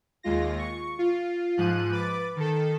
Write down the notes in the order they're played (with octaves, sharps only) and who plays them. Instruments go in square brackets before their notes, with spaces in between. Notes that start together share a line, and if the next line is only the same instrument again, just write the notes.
[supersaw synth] D#2 G#3 F4 A#6
C#6
F4
G#2 F3 F#6 D#7
B4 D6 A6
D#3 A4